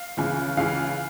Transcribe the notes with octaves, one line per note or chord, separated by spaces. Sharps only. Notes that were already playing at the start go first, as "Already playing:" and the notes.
Already playing: F5
C#2 C#3 E3
C#2 C#3 E3 F5